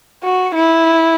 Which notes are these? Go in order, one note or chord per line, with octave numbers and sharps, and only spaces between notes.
F#4
E4